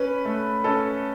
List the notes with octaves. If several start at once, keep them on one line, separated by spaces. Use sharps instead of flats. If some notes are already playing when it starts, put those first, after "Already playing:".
Already playing: C#4 B4
A3
C#4 A4